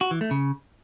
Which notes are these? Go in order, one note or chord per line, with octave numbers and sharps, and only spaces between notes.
F#4
E3
A3
C#3